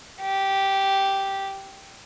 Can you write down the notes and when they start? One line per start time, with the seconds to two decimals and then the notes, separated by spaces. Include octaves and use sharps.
0.21 G4